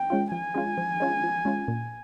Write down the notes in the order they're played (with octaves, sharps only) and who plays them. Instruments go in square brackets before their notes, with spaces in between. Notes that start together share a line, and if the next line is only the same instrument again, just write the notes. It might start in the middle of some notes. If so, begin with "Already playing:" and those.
Already playing: [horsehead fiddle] G5
[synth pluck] G#3 C#4 F4
[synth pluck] F3 [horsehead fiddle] G#5
[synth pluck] G#3 C#4 F4
F3
G#3 C#4 F4
F3
G#3 C#4 F4
A#2